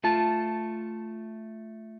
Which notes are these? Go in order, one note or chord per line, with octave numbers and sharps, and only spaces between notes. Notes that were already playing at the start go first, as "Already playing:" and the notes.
A3 F4 A5